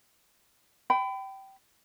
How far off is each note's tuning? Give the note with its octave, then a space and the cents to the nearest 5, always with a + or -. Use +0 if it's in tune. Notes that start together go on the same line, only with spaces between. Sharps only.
G5 -15 B5 +30